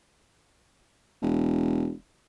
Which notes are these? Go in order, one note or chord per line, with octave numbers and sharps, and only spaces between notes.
E1